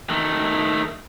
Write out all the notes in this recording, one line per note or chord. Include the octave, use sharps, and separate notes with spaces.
D#3 A3